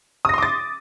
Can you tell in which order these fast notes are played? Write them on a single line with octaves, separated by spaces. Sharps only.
D#6 A#6 C6 D6 A6